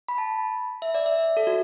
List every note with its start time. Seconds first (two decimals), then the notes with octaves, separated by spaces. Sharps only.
0.09 B5
0.18 A5
0.82 E5
0.95 D5
1.06 E5
1.37 A4
1.47 F#4